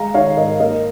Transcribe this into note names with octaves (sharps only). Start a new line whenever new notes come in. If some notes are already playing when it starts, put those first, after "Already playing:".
Already playing: G#3 F5 A#5
D#3 C#5 F5
G#2 A#4 D#5
A#3 A#4 D#5